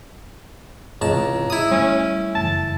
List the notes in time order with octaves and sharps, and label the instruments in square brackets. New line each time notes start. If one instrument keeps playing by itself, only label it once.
[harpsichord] C#2 A5 [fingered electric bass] G#2 C3 E3 [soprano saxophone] A#5
[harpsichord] E4 D#6
[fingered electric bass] G3 A3 [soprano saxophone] C#4
[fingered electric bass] F#1 F2 E3 [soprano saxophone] A5